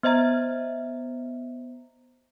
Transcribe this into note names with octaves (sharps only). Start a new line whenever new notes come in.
B3 C5 D#5 E5 A#5